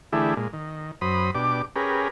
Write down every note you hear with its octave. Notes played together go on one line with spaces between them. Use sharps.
D3 E3 A3 E4 G4 G#4
A#2 G#3
D#3
F#2 C5 B5 D#6
B2 D4 G4 D6
C#4 G4 G#4 A#4 B4